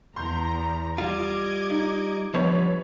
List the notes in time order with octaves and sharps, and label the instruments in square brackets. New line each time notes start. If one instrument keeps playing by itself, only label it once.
[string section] E2 A#5 [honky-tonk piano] C6 G6
[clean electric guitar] G3 F4 [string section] D#5 D6 G#6
[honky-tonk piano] D#4
[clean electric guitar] D3 F3 G3 [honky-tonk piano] B3 C#5